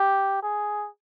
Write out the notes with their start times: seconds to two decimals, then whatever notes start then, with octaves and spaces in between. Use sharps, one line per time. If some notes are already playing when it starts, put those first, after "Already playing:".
Already playing: G4
0.43 G#4